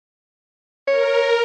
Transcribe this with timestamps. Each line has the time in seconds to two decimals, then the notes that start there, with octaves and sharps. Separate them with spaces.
0.87 A#4 C#5